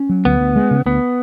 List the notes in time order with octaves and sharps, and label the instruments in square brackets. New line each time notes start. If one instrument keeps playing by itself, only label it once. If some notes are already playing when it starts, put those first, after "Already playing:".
Already playing: [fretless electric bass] C#4
F#3
[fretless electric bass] D2 [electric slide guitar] B3
[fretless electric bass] D2
G#3
C#3
[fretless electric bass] D2 [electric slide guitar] B3